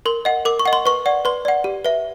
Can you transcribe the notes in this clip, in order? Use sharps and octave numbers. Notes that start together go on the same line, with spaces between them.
A#4 C6
D#5 F#5
A#4 D6
C#6
D#5 F#5
C6
B4 C#6
D5 F#5
B4 C6
D5 F#5
G4
B4 E5